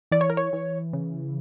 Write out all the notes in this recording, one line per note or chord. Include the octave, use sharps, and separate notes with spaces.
E3 D5
C#5
A#4
C#5
E3
C#3